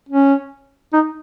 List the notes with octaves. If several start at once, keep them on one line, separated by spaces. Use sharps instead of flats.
C#4
D#4